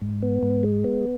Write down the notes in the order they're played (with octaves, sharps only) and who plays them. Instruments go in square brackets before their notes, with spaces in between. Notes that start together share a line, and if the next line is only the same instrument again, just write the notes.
[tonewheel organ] G#2
B3
G#2
G#3
B3